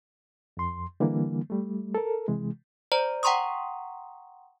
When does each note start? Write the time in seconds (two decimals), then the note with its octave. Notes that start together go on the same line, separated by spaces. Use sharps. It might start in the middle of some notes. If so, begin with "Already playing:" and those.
0.57 F2 C6
1.00 D3 E3 G3 A#3
1.50 G3 A3
1.95 A4 A#4
2.28 C3 E3 G#3
2.92 C5 D5 A#5
3.23 F#5 G5 A#5 C6 C#6 D#6